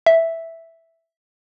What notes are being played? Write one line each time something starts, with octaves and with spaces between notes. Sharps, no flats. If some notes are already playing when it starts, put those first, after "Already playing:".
E5